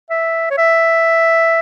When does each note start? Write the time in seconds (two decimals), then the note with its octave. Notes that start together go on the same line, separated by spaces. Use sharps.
0.10 E5
0.51 C#5
0.58 E5